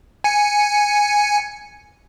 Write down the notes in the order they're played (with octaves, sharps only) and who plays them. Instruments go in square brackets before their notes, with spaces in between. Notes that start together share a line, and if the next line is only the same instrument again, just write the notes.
[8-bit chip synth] G#5 C#7